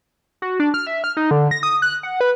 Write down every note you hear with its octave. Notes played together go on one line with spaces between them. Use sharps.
F#4
D4
F6
E5
F6
D#4
D3
A#6
D#6
F#6
F#5
B4